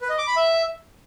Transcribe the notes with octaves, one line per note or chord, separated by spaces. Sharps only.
B4
D#5
D6
B5
E5